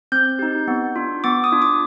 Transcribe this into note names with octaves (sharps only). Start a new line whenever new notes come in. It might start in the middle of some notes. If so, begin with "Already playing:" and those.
C4 G6
D#4 G4
B3
D4 F4
B3 D6
D#6
D4 F4
D6